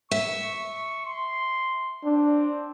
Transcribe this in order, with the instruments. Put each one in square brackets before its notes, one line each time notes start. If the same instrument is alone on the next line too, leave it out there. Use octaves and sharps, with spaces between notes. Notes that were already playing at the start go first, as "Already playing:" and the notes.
[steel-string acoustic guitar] E5 [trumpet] C#6
[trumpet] C6
[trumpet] C4 [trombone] D4